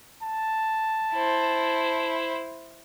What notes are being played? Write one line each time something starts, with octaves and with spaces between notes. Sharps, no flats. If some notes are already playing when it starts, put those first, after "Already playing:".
A5
E4 C5